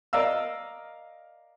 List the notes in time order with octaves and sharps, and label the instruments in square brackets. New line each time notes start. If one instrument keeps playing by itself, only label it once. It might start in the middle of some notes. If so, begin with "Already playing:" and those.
[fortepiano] A#4 D5 D#5 F5 E6